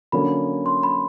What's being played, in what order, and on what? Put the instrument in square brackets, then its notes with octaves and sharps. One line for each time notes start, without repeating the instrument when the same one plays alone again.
[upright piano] D3 F#3 A#3 C#4 [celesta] B5
[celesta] C6
B5